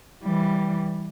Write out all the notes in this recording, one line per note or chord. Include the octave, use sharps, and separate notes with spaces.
E3 G3